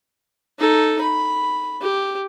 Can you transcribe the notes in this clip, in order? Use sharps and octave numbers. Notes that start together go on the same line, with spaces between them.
D#4 A4
B5
G4